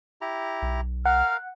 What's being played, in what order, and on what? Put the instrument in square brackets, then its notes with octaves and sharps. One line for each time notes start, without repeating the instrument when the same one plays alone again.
[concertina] E4 G4 A#5
[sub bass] B1
[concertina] A#4 F5 [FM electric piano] F#5 [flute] F6